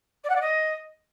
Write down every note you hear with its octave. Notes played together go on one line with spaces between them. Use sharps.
D5
F#5
D5
D#5